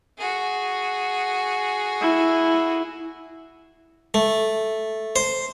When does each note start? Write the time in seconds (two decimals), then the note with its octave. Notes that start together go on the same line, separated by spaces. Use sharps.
0.18 F#4 G#4
2.01 E4
4.14 A3
5.16 C5